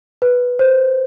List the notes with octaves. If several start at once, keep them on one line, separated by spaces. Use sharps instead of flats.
B4
C5